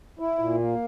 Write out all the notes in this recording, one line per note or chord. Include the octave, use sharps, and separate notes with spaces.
E4
A#2
A#3